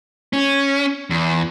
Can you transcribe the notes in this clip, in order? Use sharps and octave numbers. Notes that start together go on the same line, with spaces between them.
C#4
E2